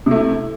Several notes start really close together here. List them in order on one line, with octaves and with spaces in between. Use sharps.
C3 A3 E4